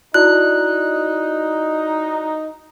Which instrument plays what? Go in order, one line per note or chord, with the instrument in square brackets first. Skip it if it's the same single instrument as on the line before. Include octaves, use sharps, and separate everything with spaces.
[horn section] D#4 [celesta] E4 F#4 D5 [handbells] F#6